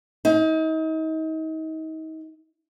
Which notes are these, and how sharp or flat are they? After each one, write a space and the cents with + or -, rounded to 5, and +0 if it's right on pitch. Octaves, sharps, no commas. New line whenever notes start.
D#4 +35